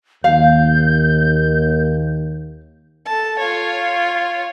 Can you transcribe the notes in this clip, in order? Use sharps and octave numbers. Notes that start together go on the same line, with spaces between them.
D#2 F5 G6
A4 A5
F4 C#5